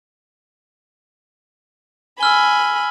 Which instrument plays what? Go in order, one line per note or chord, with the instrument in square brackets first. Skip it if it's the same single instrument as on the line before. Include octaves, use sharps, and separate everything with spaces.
[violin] G#5 B5 [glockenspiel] E6 F6 G7